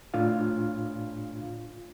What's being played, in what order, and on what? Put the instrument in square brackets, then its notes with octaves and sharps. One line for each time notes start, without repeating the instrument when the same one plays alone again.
[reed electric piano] A2 D4 F4 F5